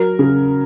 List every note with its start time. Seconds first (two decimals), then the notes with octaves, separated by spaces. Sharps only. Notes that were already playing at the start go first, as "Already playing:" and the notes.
Already playing: F#3 A#4
0.19 C#3